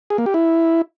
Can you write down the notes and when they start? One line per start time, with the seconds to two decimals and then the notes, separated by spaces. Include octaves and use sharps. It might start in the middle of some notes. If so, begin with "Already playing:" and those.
0.10 G#4
0.18 A#3
0.26 G4
0.34 E4